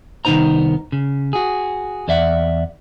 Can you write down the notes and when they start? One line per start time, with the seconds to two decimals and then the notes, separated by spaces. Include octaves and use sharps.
0.25 C2 D#3 B3 D#4 C5 A#5
0.92 C#3
1.33 F#4 G#4
2.08 E2 D5 E5 F#5